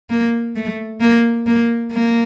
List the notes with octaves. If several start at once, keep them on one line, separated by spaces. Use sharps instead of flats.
A#3
A3
A#3
A#3
A#3